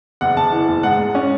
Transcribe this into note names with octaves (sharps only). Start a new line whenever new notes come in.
F#1 F#5
F#1 A5
E3
F#1
G#2 F#5
G#2
C#4